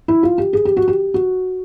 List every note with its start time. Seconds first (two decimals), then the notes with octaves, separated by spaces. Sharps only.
0.08 E4
0.23 F4
0.38 G4
0.53 G#4
0.65 G4
0.77 F#4
0.88 G4
1.14 F#4